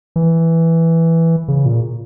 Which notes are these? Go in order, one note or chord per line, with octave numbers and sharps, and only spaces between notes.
E3
C#3
A#2